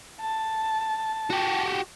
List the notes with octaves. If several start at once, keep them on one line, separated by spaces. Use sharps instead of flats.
A5
F#4 G4